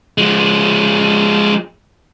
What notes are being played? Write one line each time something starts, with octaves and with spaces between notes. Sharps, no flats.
F3 G#3